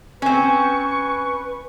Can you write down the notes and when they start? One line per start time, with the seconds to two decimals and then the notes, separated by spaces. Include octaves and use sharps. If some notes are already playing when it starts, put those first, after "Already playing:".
0.22 C4 C#4 B4 C#6